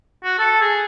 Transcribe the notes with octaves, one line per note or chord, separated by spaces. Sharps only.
F#4
A4
G#4